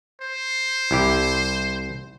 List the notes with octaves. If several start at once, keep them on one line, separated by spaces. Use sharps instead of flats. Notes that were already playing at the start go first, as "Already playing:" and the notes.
C5
C2 E4 G4